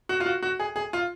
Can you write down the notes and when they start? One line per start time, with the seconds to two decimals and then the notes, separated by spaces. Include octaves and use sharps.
0.09 F#4
0.20 F4
0.26 F#4
0.43 F#4
0.60 G#4
0.76 G#4
0.93 F4